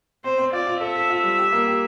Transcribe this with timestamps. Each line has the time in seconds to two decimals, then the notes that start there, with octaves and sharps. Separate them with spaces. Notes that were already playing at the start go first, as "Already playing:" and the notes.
0.24 C4 C5
0.38 C4
0.53 F4 D5
0.67 F4
0.81 A4 E5
0.95 A4
1.10 F4
1.23 G3
1.38 G4
1.52 A#3
1.67 G4